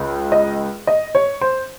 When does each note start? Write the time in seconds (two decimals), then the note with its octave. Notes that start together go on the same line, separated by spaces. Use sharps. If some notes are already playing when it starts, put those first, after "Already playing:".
Already playing: C#2 C#3
0.32 D#5
0.87 D#5
1.15 C#5
1.41 C5